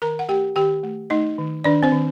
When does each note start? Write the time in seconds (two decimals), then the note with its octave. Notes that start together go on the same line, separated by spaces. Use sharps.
0.02 D#3 A#4 A#5
0.19 F#5
0.29 A3 G4 G5
0.56 D#3 G4 G5
0.83 A3
1.10 A3 D#4 D#5
1.38 D#3
1.64 D#3 D4 D5
1.83 C4 C5
1.92 D#3